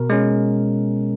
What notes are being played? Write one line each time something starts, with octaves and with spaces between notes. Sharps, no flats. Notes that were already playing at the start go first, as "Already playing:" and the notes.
Already playing: B2 A#4
G#3 C#4